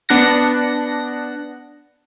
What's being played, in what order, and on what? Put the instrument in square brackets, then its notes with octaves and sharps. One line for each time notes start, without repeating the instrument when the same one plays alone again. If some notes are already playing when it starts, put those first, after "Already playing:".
[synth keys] B3 D4 F#5 A#6